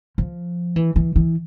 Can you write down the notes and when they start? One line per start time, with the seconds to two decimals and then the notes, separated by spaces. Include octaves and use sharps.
0.18 F3
0.76 E3
0.96 E3
1.16 E3